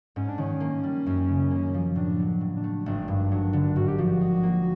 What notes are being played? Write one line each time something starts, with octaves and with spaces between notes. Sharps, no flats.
G#2 C#4
D4
D#3 C#4
A#3
G3
F#2
C#3
A#3
F3
A2 D4
F#3
A2
D4
A3
G#1 D4
G2
F#3 D4
D3
G#2 F#4
G4
F3 F#4
D#4
A#3